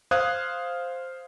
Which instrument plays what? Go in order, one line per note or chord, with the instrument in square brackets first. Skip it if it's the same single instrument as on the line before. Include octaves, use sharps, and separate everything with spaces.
[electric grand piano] C5 F5 D#6 F#6 G#6